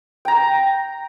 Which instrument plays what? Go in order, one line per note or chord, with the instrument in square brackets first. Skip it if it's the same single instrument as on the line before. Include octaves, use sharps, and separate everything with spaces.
[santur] G5 A#5